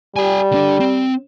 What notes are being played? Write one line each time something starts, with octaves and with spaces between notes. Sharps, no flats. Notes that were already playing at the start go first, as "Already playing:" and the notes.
G3 G4 G#5
D3 D4
C4